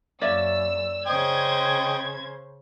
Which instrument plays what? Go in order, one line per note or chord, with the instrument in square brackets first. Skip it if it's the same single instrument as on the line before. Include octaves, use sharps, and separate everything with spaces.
[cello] F#2 [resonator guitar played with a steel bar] A#3 D5 E5 [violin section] E6
[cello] C#3 C5 [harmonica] D#5 G5 [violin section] G#6